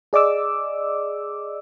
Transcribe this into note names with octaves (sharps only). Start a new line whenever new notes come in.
G#4 D5 D#5 D6 E6